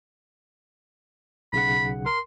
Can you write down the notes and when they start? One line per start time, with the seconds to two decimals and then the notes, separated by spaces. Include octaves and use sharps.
1.53 B1 C#3 F#5 B5
2.06 A#4 C6